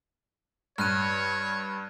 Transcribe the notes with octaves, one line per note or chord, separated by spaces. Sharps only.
G2 C#5 F6 F#6 D#7